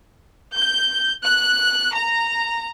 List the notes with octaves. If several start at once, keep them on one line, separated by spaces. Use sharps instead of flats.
G6
F#6
A#5